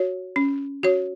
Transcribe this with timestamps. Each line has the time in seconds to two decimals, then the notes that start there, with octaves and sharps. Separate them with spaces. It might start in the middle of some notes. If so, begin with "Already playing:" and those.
Already playing: F#4 C#5
0.36 C#4
0.83 F#4 C#5